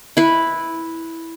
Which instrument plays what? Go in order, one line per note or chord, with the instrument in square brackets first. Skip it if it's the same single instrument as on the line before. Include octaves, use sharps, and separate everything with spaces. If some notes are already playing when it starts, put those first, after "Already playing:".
[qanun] E4 B4